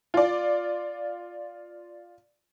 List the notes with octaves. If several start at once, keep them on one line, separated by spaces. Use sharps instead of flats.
F4 D5